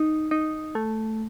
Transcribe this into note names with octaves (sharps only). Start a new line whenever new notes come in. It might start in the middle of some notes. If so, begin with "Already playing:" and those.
Already playing: D#4
D#4
A3